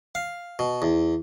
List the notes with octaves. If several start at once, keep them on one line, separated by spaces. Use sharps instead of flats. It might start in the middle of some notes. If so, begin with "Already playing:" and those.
F5
B2
E2